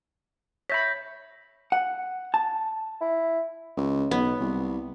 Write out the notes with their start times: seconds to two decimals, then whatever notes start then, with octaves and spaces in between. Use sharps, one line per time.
0.70 C#5 E5 B5 G6 A#6 B6
1.72 F#5
2.34 A5
3.01 E4
3.77 C#2
4.11 B1 B3
4.40 C2